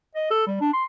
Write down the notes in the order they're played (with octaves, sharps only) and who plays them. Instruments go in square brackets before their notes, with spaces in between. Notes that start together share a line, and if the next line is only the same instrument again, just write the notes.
[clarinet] D#5
A4
G3
D4
C6